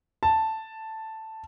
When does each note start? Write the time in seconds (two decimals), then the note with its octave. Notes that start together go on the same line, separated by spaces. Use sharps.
0.23 A5